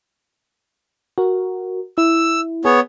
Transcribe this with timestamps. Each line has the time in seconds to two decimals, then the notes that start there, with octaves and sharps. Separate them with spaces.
1.18 F#4 A#4
1.98 E4 E6
2.65 B3 G#4 C#5